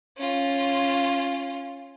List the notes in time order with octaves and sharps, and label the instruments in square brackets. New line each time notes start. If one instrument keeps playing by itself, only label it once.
[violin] C#4 F4